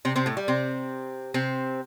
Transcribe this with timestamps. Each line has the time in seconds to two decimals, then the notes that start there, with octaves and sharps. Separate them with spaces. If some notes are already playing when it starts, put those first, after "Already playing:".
0.05 C3 C4
0.16 C3 C4
0.26 A2 A3
0.37 G3
0.48 C3 C4
1.34 C3 C4